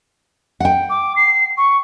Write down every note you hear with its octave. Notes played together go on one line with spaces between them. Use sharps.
F#5 G5
D6
C7
C#6